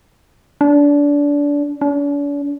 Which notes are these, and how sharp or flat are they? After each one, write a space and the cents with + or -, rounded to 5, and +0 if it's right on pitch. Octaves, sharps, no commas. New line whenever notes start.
D4 -25
D4 -45